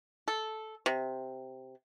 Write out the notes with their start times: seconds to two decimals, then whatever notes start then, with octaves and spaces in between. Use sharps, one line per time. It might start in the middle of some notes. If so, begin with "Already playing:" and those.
0.28 A4
0.86 C3